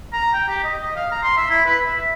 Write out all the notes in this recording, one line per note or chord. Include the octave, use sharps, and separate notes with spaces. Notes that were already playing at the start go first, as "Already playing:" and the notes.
A#5
G5
G4
D#5
D#5
F5
A#5
C6
E5
E4
B4
E5